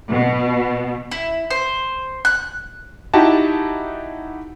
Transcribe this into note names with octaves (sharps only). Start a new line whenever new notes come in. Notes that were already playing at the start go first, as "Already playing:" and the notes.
B2
E4
C5
F#6
D#4 E4 F#4 G4 A5